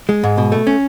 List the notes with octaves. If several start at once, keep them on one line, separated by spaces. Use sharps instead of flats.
G#3
G#2
B2
A3
C#4